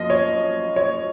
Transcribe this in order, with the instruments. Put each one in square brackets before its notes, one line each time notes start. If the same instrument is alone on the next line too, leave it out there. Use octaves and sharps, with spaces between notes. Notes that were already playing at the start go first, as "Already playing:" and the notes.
Already playing: [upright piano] F#2 F3 A#3 D#5
C#5
C#5